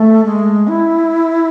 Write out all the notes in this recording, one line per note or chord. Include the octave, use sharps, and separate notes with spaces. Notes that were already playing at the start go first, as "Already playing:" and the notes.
Already playing: A3
G#3
E4